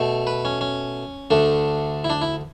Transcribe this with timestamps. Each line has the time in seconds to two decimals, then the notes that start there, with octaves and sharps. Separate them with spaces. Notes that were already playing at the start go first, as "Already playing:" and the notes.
Already playing: B2 A3
0.27 B4
0.45 C#4
0.61 C#4
1.30 D2 D3 A3 D4
2.04 E4
2.10 D4
2.22 E4